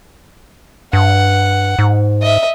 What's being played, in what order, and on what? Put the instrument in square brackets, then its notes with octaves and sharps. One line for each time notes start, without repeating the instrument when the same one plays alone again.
[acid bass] G2 [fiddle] F#5
[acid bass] G#2
[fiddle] D#5 E5